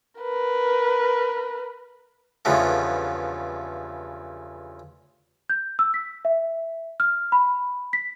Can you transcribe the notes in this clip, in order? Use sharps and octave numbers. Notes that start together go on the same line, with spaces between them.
A#4 B4
E2 G2 C#3 F3 A3 B3
G6
E6
B6
E5
F6
B5
B6